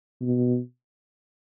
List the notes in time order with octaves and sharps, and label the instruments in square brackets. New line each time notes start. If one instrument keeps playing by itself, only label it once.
[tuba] B2